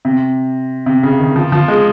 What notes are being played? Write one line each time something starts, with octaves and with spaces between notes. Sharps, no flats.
C3
C3
C#3
D#3
F3
F3
G#3